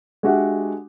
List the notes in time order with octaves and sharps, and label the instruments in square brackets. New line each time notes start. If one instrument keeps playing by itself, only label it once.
[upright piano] G#3 D4 F#4 G4 E5 F#5